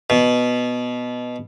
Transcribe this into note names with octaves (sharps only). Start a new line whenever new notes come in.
B2